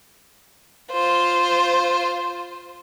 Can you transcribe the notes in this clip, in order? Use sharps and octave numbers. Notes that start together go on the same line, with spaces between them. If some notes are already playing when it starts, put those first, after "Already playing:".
F4 C5